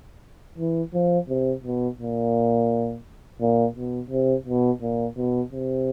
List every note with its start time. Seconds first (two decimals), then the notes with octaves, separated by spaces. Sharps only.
0.58 E3
0.94 F3
1.29 C3
1.64 B2
1.99 A#2
3.41 A#2
3.76 B2
4.10 C3
4.46 B2
4.82 A#2
5.17 B2
5.52 C3